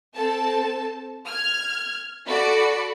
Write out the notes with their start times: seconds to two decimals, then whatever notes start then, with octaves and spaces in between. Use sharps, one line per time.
0.14 C4 A4 A5
1.26 F6 G#6
2.26 F#4 A4 D5 B5 C#7